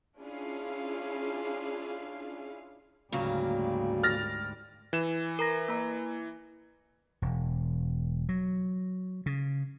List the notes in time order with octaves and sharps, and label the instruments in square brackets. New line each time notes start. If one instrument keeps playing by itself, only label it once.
[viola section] C#4 D4 E4 F4 G#4 F5
[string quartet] D2 G#2 G3 [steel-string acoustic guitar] C#3 F#3 A#3
[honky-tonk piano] F6 A6 A#6
[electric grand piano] E3 E7
[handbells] A#4 A#5 A#6
A#3 A#5
[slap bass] E1
F#3
C#3